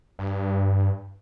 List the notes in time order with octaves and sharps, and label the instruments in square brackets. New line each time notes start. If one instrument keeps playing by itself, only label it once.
[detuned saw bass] G2